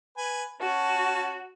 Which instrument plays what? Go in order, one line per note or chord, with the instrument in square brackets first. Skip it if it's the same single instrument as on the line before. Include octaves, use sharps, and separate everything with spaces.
[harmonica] B4 G#5
[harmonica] C#4 A5 [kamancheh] F#4